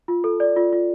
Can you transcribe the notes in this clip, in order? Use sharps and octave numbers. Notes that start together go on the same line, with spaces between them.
F4
A4
D5
F4
F4